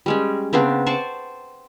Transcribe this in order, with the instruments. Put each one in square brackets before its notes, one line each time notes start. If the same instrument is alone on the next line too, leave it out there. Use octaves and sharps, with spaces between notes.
[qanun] G3 G#3 C#4
C#3 B3 C4 D4
C5 D5 A5 C#6